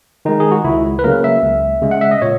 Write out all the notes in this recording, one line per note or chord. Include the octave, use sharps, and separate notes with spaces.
D#3 G#3 D#4
G#4
F#4
C#2 E4
B4
C#3 F#3 A#3 A#4
E5
C#2
C#3 G#3
F#5
E5
D#5
A#2 C#5